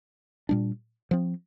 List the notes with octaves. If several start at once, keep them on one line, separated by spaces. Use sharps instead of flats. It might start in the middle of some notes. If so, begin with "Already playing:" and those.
A#2 G3 D4
F3 C4